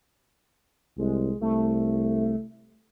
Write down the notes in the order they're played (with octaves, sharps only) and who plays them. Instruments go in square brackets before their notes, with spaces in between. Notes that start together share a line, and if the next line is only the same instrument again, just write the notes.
[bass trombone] C2 [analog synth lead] G#3
[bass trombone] C2 [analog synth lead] A3